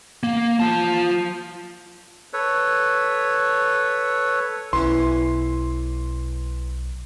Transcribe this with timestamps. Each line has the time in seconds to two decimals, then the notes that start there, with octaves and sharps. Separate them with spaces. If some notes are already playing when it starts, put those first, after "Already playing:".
0.23 A#3
0.60 F4 A5
2.33 A4 B4 C#5
4.73 B1 E3 C#4 E4 C6